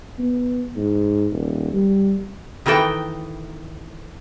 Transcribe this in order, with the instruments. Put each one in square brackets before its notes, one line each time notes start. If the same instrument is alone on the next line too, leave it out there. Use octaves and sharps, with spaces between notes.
[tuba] B3
G#2
D#1
G3
[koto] D#3 E3 D#4 A4 G5